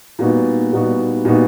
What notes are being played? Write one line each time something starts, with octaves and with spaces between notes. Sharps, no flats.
A#2 G3 B3 D#4 F#4
A#2 G3 B3 D#4 F#4
A#2 G3 B3 D#4 F#4